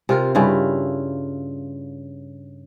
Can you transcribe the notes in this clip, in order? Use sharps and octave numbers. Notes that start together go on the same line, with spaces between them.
C3 F4 A#4
G2 C#3 E4 F4